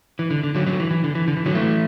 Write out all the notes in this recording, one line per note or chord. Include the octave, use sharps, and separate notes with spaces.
E3
D3
D3
D3 F#3
D3 F#3
E3
E3
D3
E3
D3
E3
D3 F#3
E3 A3